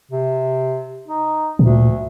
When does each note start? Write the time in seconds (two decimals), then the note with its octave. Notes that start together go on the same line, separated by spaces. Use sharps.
0.11 C3
1.08 D#4
1.59 D2 A#2